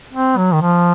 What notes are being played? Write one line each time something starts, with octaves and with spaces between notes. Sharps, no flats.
C4
F#3
D#3
F3